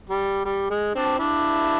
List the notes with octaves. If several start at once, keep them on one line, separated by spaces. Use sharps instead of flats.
G3
G3
G#3
C4 D4
D4 E4